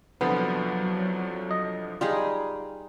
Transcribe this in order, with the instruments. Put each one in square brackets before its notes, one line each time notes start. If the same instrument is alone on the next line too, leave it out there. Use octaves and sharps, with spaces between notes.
[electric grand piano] C2 D3 F3 [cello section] F#3 [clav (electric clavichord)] B3 [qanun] F4
[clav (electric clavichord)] D#5
[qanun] G3 D#4 G#4 [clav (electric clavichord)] F4